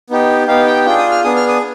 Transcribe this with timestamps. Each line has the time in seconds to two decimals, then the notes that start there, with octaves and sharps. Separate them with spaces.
0.10 B3 D#4 G4
0.47 B3 D#4 G4 F5
0.66 G5
0.85 D4 F4 G#4 G5
0.98 D#6
1.11 F6
1.24 B3 D4 G#4 D#6
1.36 F6
1.48 D#6